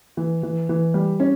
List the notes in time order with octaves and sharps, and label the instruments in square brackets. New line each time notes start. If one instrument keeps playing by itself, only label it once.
[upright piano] E3
E3
E3
G3
[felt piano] C#4